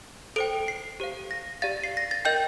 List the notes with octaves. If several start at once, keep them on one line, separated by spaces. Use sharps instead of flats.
A4 C5 G5 D7
C7
G4 C5 F5
A#6
G4 D5 F5 A6
C7
A#6
A6
A#4 D#5 G5 G6